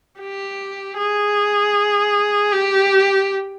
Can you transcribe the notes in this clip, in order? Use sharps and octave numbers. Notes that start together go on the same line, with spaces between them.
G4
G#4
G4